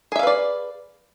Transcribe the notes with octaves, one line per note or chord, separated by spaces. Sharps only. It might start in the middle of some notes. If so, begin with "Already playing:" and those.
G#4 B4 D5 E5 F5